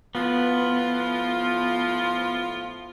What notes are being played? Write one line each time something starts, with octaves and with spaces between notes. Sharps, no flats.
A2 F3 B3 F4